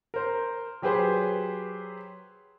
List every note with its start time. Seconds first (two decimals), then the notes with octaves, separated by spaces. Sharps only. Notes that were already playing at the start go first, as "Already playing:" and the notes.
0.14 A#4 C5
0.82 F#3 G4 G#4 B4 C5